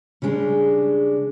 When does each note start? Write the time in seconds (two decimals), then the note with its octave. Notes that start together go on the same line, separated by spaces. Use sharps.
0.22 C#3 G3 G#3 D4